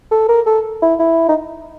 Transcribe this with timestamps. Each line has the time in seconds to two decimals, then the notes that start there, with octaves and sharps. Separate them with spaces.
0.11 A4
0.28 A#4
0.46 A4
0.82 E4
0.99 E4
1.29 D#4